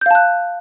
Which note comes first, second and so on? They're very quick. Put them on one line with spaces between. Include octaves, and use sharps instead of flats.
G6 F5 A5 F#6